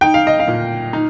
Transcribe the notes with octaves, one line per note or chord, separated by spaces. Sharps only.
D#4 G5
F5
D#5
F5
A#2
D#4